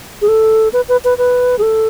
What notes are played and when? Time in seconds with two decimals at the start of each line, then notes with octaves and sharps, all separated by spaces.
0.22 G#4
0.28 A4
0.73 B4
0.89 B4
1.05 B4
1.18 B4
1.59 G#4
1.62 A4